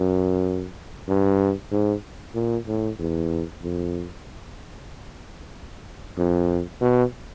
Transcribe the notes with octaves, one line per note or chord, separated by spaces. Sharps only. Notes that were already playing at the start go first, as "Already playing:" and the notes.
Already playing: F#2
G2
G#2
A#2
A2
E2
F2
F2
B2